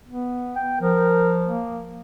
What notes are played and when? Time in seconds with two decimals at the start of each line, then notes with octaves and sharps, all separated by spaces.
0.08 B3
0.56 G5
0.81 F3 A#4
1.44 A#3